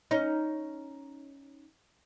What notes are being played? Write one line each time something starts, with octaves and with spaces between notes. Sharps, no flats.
C#4 D#4